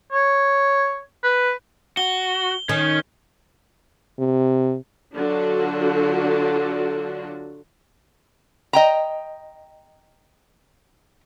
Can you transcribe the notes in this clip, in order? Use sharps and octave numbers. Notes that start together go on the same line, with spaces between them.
C#5
B4
F#4 G7
D#3 C#4
C3
D3 F#3 D4 F4 F#4
D#5 G5 A#5